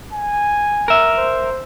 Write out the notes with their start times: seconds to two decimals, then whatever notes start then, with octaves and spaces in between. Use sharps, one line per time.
0.13 G#5
0.88 A#4 E5
1.18 C5